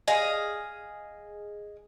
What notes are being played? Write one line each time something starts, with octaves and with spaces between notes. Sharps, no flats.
G#4 D#5 F5